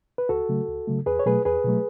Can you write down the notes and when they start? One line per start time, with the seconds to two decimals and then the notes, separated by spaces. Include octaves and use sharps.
0.18 B4
0.29 C#2 F#4 A4
0.49 C#3 F#3 A3
0.69 C#2
0.88 C#3 F#3 A3
1.06 E2 G#4 B4
1.19 C#5
1.26 B2 F#3 A3 G#4 B4
1.45 E2 G#4 B4
1.64 B2 F#3 A3